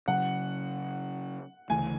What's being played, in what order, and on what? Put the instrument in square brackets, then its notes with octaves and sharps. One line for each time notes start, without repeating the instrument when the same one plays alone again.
[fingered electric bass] C#3 F#3 C#4 [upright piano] F#5
[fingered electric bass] D2 C#3 E3 A3 [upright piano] G#5